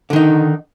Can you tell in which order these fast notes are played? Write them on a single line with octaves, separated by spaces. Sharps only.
D3 D#3 D#4